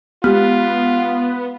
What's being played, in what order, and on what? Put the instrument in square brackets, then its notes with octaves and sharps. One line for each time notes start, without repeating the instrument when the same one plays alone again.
[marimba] G#3 G4 F6 [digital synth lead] B3 [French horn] F4